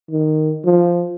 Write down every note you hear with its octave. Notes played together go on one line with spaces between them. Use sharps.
D#3
F3